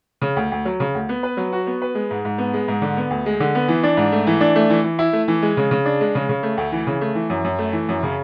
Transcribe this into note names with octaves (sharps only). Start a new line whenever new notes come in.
C#3
D2
D2
F#3
C#3
D2
B3
B4
F#3
F#4
B3
B4
G#3
G#2
G#2
B3
G#3
G#2
D3
B3
D2
G#3
D3
B3
E3
D4
G#2
A3
E3
D4
A3
E3
E3
E4
A3
E3
G#3
C#3
C#3
D4
G#3
C#3
C#3
A3
D2
E3
C#3
A3
E3
F#2
F#2
A3
E3
F#2
C#3